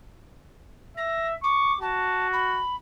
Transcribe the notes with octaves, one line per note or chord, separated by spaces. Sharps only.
E5 A#6
C#6 D6
F#4 A5
B5